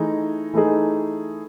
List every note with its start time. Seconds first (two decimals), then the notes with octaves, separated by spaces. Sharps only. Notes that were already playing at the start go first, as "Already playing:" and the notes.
Already playing: E3 A3 D#4 G#4
0.53 E3 A3 D#4 G#4